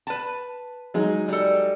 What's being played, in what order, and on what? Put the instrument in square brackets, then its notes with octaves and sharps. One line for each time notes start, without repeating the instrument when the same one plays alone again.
[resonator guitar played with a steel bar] B4 A5
[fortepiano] F#3 G#3 D#4
[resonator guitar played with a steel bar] G3 A4